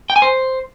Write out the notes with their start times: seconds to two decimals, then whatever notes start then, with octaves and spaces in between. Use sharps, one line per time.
0.10 G5
0.16 G#5
0.22 C5